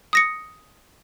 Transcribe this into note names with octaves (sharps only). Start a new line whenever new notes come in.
D#6 A#6 C#7